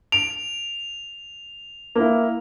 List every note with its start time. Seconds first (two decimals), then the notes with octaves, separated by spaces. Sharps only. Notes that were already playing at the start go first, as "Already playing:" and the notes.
0.12 D7 F7
1.95 A#3 E4